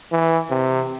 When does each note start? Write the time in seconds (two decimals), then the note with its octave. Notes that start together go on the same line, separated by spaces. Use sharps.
0.12 E3
0.50 C3